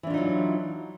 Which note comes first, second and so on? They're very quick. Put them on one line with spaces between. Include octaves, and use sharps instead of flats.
E3 D4 F4 D#4 F#3